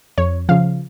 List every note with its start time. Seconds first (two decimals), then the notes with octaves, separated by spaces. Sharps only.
0.18 F2 C#5
0.49 C#3 F3 F5